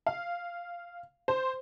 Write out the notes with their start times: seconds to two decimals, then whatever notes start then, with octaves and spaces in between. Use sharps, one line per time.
0.07 F5
1.28 C5